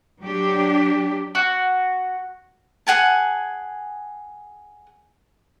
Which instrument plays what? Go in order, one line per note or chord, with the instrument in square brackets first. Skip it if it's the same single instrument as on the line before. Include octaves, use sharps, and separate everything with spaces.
[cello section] F#3 D4 G4
[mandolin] F#4
[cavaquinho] G#4 F#5 G#5 A5